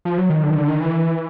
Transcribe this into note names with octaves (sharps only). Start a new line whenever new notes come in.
F3
F#3
D#3
D3
D#3
D3
D#3
E3